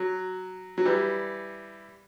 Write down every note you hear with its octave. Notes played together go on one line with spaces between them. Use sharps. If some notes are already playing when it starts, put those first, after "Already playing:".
Already playing: F#3
F#3
E3 G3